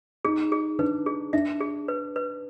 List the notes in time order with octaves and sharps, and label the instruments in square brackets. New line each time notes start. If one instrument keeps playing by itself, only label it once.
[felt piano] D#4 [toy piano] G#4
[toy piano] G#4
[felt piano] D4 [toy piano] B4
[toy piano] G#4
[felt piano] D4 [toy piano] E5
[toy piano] G#4
B4
B4